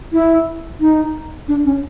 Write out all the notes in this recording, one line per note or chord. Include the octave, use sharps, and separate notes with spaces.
E4
D#4
D4
C#4